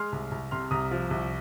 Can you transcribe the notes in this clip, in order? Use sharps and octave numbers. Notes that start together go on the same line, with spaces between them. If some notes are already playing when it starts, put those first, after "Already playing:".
Already playing: G#3 C6 F6
C2
C2
C3 C6 F6
C2 A#5 D#6
F3
C2